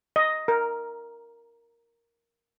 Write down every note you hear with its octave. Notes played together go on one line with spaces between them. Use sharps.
D#5
A#4